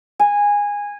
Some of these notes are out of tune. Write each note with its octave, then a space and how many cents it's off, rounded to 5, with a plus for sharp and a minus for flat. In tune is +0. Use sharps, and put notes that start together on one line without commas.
G#5 -15